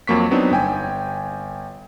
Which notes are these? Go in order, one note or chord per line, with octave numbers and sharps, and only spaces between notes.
F2 F#3 A#3 C#6 B6
F#3 B3 C4 D4 D#4
G1 G5 G#5